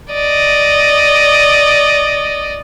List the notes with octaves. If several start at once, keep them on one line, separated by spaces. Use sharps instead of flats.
D5 D#5